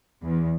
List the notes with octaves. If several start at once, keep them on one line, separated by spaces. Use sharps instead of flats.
E2